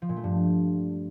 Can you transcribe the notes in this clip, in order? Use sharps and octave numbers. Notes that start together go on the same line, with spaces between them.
F3
A#2
A3
G2